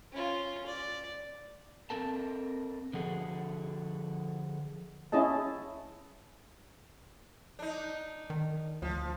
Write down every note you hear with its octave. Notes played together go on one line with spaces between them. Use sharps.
C#4 F4
D5
C4 A4 A#4 A5
D3 F3 F#4 G#4 A4
C#4 E4 G#4 D#5 A5
D4 D#4
D#3
D2 F3